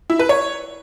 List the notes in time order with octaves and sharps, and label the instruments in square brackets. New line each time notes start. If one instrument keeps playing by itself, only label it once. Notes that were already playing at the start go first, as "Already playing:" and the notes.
[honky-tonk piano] E4
B4
C#5